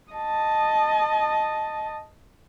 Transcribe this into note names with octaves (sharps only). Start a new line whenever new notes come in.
D#5 A5